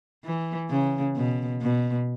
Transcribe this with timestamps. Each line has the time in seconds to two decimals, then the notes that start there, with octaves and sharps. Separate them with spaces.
0.24 E3
0.70 C#3
1.16 B2
1.61 B2